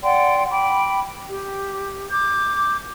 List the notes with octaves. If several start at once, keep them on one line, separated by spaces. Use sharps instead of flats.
D5 F#5 G5 C6
G5 B5 D6
G4
D6 G6